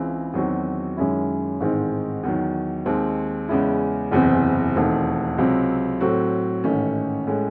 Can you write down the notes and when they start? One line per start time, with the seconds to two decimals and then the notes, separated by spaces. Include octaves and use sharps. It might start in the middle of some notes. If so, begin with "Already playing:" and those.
Already playing: C#2 C#3 E3 C4
0.34 E2 D#3 F#3 C4 F#4
0.97 F#2 D#3 G#3 C#4 E4
1.60 A1 G#2 D#3 G#3 C4
2.23 E2 D#3 F#3
2.86 D#2 D#3 G#3 C4
3.49 E2 C#3 G#3 C#4 E4
4.11 F#1 E2 C3 E3 C4
4.76 E1 D#2 D#3 A3 C4
5.38 C#2 C3 F#3 C4
6.01 A2 F#3 C4 F#4 A4
6.64 A1 G#2 D#3 A3 C#4
7.27 A2 G#3 C#4